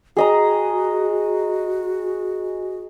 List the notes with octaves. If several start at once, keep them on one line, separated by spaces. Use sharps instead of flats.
F#4 G#4 D#5 A#5